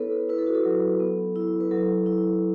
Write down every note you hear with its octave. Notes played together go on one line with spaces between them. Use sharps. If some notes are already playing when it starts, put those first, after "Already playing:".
Already playing: B3 E4 A4 B4 C#5
A4
E4 B4
A4
F#4
A4
F#3
B3
E4
B4
F#3 A4
E4